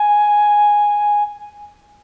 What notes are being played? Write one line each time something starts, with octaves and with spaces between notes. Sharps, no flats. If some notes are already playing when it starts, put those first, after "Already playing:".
Already playing: G#5